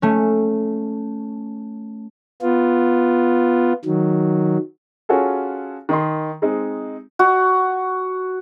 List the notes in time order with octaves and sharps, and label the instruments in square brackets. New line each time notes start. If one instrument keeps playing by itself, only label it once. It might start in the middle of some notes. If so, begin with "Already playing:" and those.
[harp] A3 C#4
[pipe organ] B3 F4
D#3 F#3
[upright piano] C#4 F4 F#4 G#4 A4
D#3 D#5 C6
G#3 C4 D#4
[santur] F#4